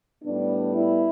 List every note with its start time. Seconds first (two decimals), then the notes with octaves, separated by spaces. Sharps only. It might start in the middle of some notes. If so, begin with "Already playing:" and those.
0.22 A2 G3 B3 D4
0.75 E4